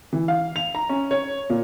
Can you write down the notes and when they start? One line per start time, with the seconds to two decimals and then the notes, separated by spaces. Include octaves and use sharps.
0.13 E3
0.28 F5
0.56 F7
0.75 A#5
0.89 C#4
1.11 C#5
1.50 A#2